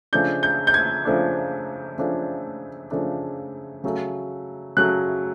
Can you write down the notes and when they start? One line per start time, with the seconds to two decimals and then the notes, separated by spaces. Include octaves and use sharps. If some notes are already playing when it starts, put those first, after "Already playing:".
0.13 C#3 F3 A3 D4 G6
0.43 G6
0.67 G6
0.74 G#6
1.05 C#3 F3 A3 D4
1.98 C#3 F3 A3 D4
2.91 C#3 F3 A3 D4
3.84 C#3 F#3 A3
4.77 C#3 F#3 A3 F#6